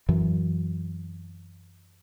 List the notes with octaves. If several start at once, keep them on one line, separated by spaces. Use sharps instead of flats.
F#2 E3 F#3